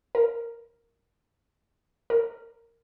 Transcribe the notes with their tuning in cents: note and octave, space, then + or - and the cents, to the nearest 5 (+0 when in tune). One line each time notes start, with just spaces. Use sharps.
A#4 +0
A#4 -10